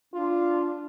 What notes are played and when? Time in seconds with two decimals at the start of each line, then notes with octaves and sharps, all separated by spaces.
0.14 D4 F4